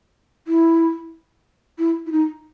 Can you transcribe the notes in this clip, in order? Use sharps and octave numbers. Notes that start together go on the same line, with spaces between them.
E4
E4
E4
D#4